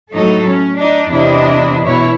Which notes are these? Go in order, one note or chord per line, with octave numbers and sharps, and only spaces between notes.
A2 F#3 D#4 A4
C#4
D4 D#4
E2 C3 D4 E4 D#5
E2 B2 E4 C#5